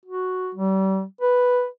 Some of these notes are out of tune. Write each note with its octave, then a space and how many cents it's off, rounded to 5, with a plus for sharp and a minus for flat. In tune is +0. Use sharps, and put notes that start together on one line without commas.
F#4 +0
G3 -35
B4 +0